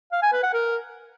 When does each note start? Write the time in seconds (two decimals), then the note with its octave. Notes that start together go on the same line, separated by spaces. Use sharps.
0.12 F5
0.22 G#5
0.33 B4
0.43 F#5
0.53 A#4